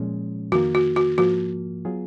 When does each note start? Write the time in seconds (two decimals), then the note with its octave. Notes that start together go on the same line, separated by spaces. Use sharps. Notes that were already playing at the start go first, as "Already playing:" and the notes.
Already playing: A#2 F3 G#3 C#4
0.52 F2 D#3 A#3 F#4
0.75 F#4
0.96 F#4
1.18 G#2 F3 A#3 F#4
1.85 F#3 B3 F4 G#4